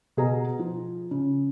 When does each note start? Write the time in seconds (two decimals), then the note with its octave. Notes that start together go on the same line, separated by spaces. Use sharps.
0.17 B2 G#4 A#5
0.59 F3
1.11 C#3